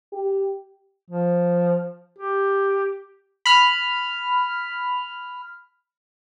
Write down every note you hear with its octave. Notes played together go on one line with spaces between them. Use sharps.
G4
F3
G4
B5 F6